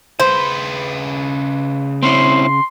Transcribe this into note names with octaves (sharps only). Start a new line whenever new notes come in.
C#3 B4 C5
C4 C#4 E4 C6